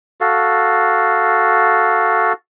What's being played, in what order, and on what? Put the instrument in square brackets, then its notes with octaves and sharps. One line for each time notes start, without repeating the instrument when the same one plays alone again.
[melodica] F#4 A4 F5